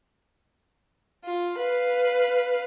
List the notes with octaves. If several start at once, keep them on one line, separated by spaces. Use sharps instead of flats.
F4
B4 F5